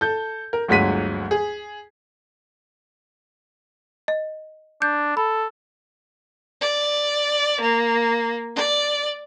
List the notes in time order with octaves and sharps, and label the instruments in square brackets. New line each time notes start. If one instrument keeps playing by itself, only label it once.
[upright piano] A4 G6
A#4
G1 D2 F#3 G#3 B6 D#7
G#4
[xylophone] D#5
[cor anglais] D4 [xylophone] G6
[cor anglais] A4 [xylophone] B5
[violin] D5
A#3
D5